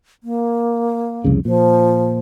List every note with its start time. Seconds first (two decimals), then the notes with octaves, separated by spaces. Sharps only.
0.23 A#3
1.24 C2 F2 C#3
1.45 A#2 F3